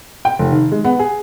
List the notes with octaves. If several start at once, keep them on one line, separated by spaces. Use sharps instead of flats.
G5
F1
D#3
G#3
B3
G#4